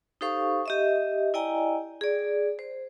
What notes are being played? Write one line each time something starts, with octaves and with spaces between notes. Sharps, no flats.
D#4 G4 A4 C5 F5 C#6
G4 D#5 E5
E4 D5 D#5 G5 G#5 A#5
G#4 D5
C5